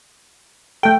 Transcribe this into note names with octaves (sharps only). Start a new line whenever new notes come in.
A3 A4 G5